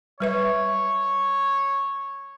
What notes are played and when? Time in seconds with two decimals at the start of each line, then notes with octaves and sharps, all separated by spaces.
0.20 G3 B4 C#5 E5